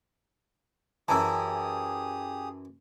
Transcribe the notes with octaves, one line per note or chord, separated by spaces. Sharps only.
F#2 E3 G4 G#4 A5 A#5 D#6 E6